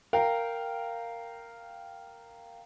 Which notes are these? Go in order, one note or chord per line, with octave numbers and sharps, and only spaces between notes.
A#4 F5 G5